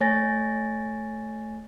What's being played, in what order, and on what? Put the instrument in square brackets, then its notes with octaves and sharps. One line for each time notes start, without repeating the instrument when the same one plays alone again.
[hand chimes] A3 C#5 G#5 A6 A#6